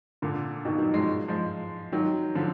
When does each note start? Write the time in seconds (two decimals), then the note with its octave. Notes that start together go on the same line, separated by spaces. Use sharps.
0.22 A#2 D3
0.65 B2 D#3
0.78 D#3 F#3
0.94 F3 G#3
1.28 F3 G#3
1.92 D#3 F#3
2.35 D3 F3